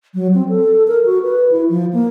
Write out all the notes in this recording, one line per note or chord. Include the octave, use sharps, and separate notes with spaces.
F#3
C4
A4
A#4
F#4
B4
E4
F3
A#3